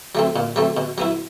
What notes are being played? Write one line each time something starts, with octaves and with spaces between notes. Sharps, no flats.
F#3 A3 C4
A#2
F#3 A3 C4
B2
F#3 B3 E4